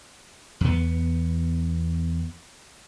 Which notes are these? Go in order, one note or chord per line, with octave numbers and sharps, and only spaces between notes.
E2 B3